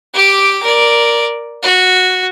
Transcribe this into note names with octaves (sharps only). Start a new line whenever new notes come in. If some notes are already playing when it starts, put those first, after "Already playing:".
G4 D6
A#4 D5
F#4